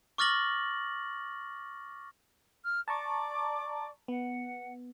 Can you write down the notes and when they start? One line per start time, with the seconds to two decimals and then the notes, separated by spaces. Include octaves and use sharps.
0.18 C#6 D6 F6 A6 A#6 F#7
2.64 F6
2.88 D5 A5 A#5 C#6 D6
4.08 B3 F#5